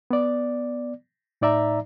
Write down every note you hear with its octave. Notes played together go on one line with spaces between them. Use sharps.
B3 D5
A2 D#4 D5 E5 A#5